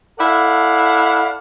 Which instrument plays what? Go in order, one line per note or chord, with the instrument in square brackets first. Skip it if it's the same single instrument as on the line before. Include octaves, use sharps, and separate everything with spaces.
[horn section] E4 A4 D5 F5 F#5